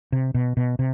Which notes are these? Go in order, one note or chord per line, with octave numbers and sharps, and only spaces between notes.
C3
B2
B2
C3